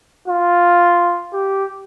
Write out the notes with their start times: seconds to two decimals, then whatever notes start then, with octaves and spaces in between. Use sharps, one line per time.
0.28 F4
1.33 G4